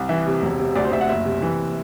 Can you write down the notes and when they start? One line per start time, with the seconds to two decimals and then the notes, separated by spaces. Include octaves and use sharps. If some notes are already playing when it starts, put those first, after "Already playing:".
Already playing: C2
0.09 E3 E5
0.27 C3
0.43 E1
0.59 C3
0.75 D2 D5
0.84 C5
0.92 D2 E5
1.01 F#5
1.09 F#1 E5
1.25 C3
1.42 E3